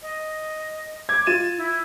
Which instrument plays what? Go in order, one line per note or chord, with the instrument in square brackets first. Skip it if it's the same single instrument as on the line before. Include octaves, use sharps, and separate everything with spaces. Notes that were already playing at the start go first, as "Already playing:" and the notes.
[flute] D#5
[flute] D6 [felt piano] G#6
[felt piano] F4 D#7 E7 [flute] A6
[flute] E4